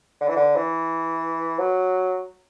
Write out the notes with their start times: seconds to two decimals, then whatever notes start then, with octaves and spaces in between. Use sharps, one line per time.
0.21 D3
0.28 E3
0.36 D3
0.56 E3
1.59 F#3